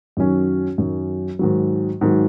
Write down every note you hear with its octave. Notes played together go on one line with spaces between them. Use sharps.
F#2 D#3 F#3 C#4
F#2 D#3 F#3 C#4
G#2 D#3 F#3
G#2 D#3 F#3